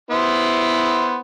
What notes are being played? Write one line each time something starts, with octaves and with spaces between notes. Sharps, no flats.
B3 E4 C5